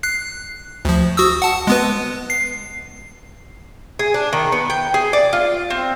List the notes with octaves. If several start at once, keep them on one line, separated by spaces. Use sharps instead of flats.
F#6 C7
D2 F3
F#4 D#6 E6
F#5 A5
G#3 B3 B4
C7
G#4
D4
D#3
B3
G5
G#4
D5
F4
C4